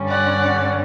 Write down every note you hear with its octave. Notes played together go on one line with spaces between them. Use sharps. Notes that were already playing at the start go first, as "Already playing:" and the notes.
Already playing: G2 D3 G3 C#4
D5 F#5